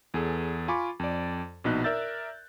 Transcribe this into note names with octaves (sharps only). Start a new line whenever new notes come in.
E2 G#4 A4
F4 G#5 B5 C#6 D6
F2 D5
A#1 B2 D#4 F#6
A#4 D5 E5 E6 G6 A6